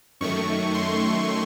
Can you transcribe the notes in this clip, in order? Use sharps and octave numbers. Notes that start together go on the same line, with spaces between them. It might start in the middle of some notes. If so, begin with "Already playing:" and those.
F#2 D#3 A3 C#6
C6